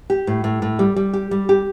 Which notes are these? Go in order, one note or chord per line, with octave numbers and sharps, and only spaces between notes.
G4
A2
A2
A2
G3
G3
G4
G3
G4